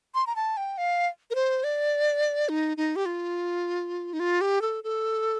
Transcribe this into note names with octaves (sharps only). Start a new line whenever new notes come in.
C6
A#5
A5
G5
F5
A#4
C5
D5
D#4
D#4
G4
F4
D#4
F4
G4
A4
A4